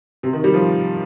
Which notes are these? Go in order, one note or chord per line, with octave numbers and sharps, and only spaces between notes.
C3
D#3
G3
F3